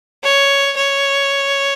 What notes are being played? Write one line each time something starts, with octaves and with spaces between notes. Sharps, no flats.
C#5
C#5